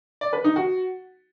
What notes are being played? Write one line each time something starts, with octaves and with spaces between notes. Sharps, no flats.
D5
B4
D#4
F#4